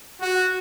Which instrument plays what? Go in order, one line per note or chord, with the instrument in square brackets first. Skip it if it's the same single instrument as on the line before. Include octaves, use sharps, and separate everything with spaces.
[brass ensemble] F#4